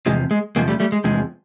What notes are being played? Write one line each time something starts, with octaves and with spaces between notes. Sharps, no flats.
E2 C3 F3 G#3
G#3
E2 C3 F3 G#3 A#3
G3 A3
G3 A3
G#3
E2 C3 F3 G#3